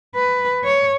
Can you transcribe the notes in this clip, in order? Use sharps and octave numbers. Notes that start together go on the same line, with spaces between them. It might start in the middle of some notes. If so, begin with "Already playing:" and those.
B4
C#5